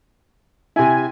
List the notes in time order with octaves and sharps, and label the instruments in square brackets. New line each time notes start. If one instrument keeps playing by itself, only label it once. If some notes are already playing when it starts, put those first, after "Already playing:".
[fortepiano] C3 E4 [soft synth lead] G#5